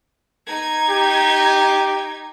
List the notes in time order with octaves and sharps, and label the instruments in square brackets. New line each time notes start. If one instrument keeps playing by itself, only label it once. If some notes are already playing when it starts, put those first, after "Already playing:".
[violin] D#4 G#6
[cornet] G4